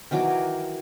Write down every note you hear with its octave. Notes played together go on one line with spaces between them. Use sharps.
D#3 E3 F#3 D6